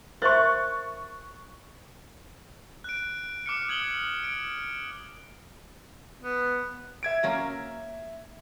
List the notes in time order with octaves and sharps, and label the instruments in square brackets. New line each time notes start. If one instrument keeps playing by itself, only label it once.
[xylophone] A#4 C5 E5 [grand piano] C#6 A6 [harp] F#6
[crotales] F#6 D7
D6 F6 C#7
D#6 G#6 F#7 G7
D7
[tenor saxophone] B3
[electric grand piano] E5 G#6 D7
[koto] F#3 A#3 C#4